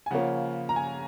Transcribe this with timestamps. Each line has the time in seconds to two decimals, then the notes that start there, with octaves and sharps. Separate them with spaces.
0.06 G#5
0.11 C#3 F3 A#3 C#4 F#5
0.69 A#5
0.76 G#5